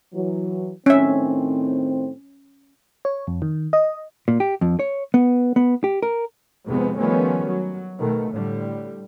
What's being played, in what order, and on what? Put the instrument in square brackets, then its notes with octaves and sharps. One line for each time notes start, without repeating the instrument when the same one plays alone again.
[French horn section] E3 F#3
[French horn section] A2 D#3 C4 [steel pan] C#4 E5
[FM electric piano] C#5
F2
D#3
D#5
[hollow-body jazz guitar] A#2
G4
F2
C#5
B3
B3
G4
A#4
[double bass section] F2 G#2 C3 G#3 B3
D#3 F3 G3 A3 B3 C#4
F#3
B2 D#3 A3
A2 D3 G3